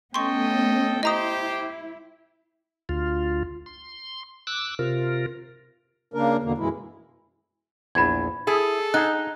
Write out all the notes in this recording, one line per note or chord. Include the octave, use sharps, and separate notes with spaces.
A3 B3 C#4 A4 D#5 G5 C6 C#6
E4 G4 C5 D#5 A#5 D#6
D2 F4
C6
D6 E6 F#6
C3 F4 A#4
C#3 A#3 D4 A#4
E2 B2 D3 A#3
F#2 B2 E3 G#3 E4
A#1 E2 B5 G#6
E4 G#4 A4
D#4 G#4 F#5 F#6